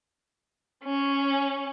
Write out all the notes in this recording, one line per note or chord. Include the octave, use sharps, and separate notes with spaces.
C#4